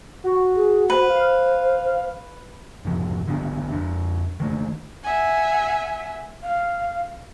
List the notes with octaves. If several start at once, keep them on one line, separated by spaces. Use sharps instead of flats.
F#4
G#4
B4 C5
F5
F1 G#2 F3
D3 D#3 B3 D4
F2 D4
D#3 A3 A#3
E5 F#5 G#5
F5